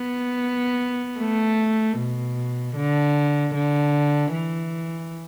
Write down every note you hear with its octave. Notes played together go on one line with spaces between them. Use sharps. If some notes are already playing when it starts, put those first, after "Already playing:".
Already playing: B3
A3
B2
D3
D3
E3